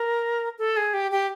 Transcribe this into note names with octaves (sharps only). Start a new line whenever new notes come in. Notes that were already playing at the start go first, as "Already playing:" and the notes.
Already playing: A#4
A4
G#4
G4
G4